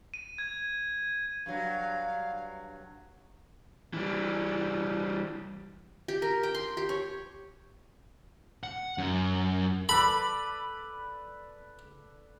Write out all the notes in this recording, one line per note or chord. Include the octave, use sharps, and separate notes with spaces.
D#7
G#6
G2 F#3 F5
E3 G3
G4
A#4
G5
C6
G4
C#5
F#5
F#2
A4 B4 D5 B5